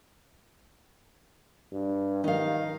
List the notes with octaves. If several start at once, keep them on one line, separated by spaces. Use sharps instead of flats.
G2
D#3 D#4 F5